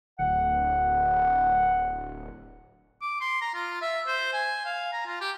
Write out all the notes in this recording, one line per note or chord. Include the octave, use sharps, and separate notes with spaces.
D1 F#5
D6
C6
A#5
F4
E5
C5
G#5
F5
A#5
F4
G4